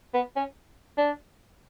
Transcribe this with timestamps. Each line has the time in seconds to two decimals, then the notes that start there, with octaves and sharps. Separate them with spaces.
0.14 B3
0.36 C#4
0.98 D4